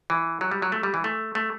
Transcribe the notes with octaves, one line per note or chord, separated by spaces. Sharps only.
E3
F#3
G3
F#3
A3
G3
E3
A3
A3